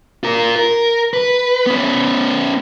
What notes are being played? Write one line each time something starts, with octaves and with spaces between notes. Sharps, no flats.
F4 A#4
A#4
B4
B3 C#4